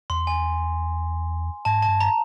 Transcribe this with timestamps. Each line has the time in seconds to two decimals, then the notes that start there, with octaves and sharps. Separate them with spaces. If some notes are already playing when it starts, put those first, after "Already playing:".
0.10 E2 C6
0.27 G#5
1.65 G#2 A5
1.82 A5
1.88 G2
2.01 A#5